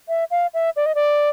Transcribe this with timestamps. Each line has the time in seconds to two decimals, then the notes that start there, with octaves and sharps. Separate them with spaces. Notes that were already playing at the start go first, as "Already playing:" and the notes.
0.09 E5
0.31 F5
0.54 E5
0.76 D5
0.86 D#5
0.95 D5